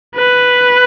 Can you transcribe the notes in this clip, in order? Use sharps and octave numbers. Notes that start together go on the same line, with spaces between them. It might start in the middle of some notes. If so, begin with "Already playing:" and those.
B4